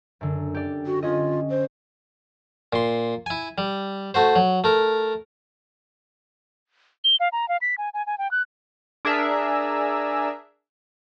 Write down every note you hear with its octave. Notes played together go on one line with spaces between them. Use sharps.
F#2 D3
G4 D5
F#4
C#4 F4 D#5
C5
A#2 C6
E4 G#5
G3
A3 F#4 C5
F#3
A3 A#4
G7
F5
A#5
F5
B6
G#5
G#5
G#5
G5
F#6
D4 G#4 A#4 E5